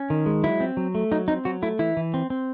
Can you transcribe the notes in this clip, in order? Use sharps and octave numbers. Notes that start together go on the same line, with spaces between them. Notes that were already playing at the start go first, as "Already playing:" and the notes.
Already playing: C#4
D#3
G#3
F#3 E4
C4
F#3
A3
F#3 D#4
C4 D#4
F#3 F#4
A3 E4
E3 E4
E3
C4
C4